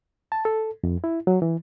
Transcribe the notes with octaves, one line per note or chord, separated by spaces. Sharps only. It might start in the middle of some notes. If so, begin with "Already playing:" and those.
A5
A4
F2
E4
F#3
E3